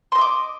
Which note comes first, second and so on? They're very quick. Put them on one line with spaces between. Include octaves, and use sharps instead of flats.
C6 D#5 E5 D6